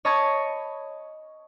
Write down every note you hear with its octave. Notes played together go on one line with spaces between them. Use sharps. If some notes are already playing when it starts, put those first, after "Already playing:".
C#5 D#5 A5 B5 C#6 G#6